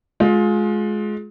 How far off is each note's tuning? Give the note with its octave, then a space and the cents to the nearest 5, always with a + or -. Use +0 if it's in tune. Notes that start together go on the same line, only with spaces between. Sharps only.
G#3 +25 F4 +25